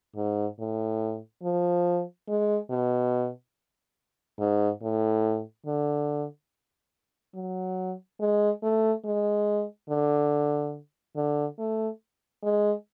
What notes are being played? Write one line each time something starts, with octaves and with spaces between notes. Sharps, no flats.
G#2
A2
F3
G#3
B2
G#2
A2
D3
F#3
G#3
A3
G#3
D3
D3
A3
G#3